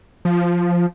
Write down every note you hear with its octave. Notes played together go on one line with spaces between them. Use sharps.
F3